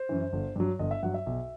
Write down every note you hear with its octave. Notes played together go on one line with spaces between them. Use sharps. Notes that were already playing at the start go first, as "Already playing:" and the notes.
Already playing: C5
F#2 E3
G1
G2 F#3
G1 D#5
E5
G2 F#3 F#5
E5
B1